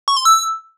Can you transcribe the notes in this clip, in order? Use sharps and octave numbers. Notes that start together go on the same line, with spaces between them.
C#6
C6
E6